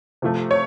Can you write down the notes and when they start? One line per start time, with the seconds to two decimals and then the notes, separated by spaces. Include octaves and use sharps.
0.22 C3 F3 A3
0.51 C#5